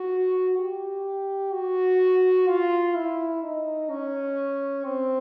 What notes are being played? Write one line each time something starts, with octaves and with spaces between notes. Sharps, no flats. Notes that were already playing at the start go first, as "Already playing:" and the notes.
Already playing: F#4
G4
F#4
F4
E4
D#4
C#4
C4